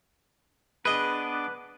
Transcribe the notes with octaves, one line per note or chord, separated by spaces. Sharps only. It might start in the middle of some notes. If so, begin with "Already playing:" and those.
B3 D4 G#4 B4 D#5 D6